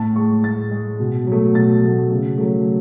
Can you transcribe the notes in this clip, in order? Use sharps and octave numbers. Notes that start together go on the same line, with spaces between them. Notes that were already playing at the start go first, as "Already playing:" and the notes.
Already playing: A2 A5
G#3 C#6
A2 A6
G#3
B2
F#3 A3
B2 A6
F#3 A3
C#3
F#3 A3